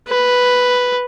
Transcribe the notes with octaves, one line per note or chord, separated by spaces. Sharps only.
B4